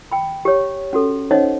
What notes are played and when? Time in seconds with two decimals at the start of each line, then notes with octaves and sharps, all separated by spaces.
0.12 G5 B5
0.45 G4 C#5
0.93 C#4 F#4 A4
1.31 C#4 D#4 C5 C#5 D#5 F#5